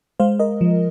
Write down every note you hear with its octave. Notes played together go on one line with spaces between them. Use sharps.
G#3 C5 F5
A#4 D#5
F3